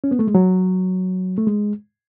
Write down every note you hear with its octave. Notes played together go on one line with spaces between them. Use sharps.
C#4
B3
A3
G#3
F#3
A3
G#3